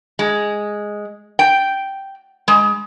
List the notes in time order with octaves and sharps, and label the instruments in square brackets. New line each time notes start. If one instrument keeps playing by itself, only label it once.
[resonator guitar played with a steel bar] G#3
G5
G#3